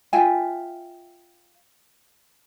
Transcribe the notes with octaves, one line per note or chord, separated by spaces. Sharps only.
F4 E5 G5 G#5